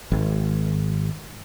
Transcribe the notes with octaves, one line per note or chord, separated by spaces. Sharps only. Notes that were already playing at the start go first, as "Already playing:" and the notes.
G#1